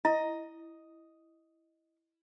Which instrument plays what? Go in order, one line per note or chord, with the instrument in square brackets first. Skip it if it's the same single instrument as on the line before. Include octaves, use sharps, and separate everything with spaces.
[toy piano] E4 [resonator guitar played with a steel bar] D#5